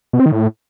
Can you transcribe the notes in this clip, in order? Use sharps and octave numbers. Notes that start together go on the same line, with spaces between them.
B2
C4
D#3
A2